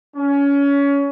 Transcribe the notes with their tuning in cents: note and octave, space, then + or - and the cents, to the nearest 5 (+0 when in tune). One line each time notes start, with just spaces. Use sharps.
C#4 +25